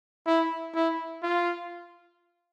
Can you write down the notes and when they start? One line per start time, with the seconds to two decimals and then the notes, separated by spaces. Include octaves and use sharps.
0.26 E4
0.74 E4
1.23 F4